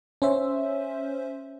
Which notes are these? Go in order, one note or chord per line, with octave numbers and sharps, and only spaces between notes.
C#4 C5 E5